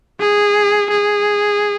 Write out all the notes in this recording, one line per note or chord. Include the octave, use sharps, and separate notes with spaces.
G#4
G#4